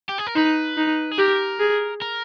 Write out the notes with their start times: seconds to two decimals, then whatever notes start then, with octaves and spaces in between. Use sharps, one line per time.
0.09 G4
0.18 G#4
0.27 A#4
0.35 D#4 B4
0.77 D#4
1.11 G#4
1.18 G4 A#4
1.60 G#4
2.02 A#4